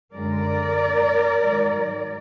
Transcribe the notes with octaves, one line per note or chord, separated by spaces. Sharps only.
F#2 D3 G#3 A#4 D5
G#2 D#3 F#3